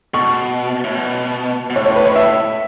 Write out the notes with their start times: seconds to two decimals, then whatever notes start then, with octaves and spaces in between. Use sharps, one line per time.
0.14 B2 C#6
0.84 A2
0.95 B2
1.70 B2
1.75 A2 C#5
1.86 C#5
1.96 B4
2.06 C#5
2.16 E5